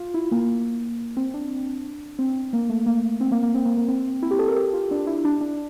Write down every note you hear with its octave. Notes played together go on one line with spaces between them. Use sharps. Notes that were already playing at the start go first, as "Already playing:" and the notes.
Already playing: F4
E4
A#3
C4
D4
C4
A#3
A3
A#3
C4
A#3
A#3
C4
A#3
A#3
C4
E4
G4
A4
A#4
G4
F4
D4
E4
D4
D4